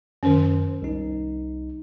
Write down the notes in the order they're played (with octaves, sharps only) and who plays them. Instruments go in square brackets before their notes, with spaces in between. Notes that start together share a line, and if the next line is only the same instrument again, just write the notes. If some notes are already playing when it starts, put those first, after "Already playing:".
[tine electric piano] F#2 C5 [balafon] D#3 C#4
[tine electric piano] C2 D#4